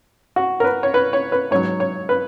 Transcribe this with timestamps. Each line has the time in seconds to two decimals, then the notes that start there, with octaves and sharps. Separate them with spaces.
0.36 F#4
0.60 A#4
0.64 B4
0.83 C#5
0.94 B4
1.13 C#5
1.32 B4
1.51 G#2 F#3 C#5
1.80 C#5
2.09 B4